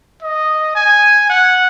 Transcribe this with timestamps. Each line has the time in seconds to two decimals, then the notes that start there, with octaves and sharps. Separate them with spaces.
0.22 D#5
0.75 G#5
1.30 F#5